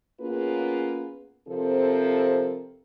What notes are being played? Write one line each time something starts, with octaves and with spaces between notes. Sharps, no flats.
A#3 B3 C#4 F4 G#4 B4
C3 F3 C4 A4 A#4 C5